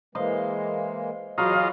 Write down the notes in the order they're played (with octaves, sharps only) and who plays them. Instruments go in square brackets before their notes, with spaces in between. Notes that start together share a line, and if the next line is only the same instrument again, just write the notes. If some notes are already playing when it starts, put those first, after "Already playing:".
[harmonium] E3 G#3 A#3 [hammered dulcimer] C5 D#5 F5
[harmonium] E2 G#4 [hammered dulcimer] F#3 B4 F5 [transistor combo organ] F4 D#5